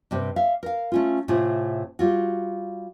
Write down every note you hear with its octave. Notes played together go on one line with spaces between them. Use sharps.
G2 C3 C4
E5 F5
A#4 F5
A3 C#4 F4
A2 C3 A3 F4 G#4
G3 F4 F#4